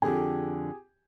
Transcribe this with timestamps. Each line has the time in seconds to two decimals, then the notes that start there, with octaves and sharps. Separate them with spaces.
0.02 F2 D3 G4 G#4 G#5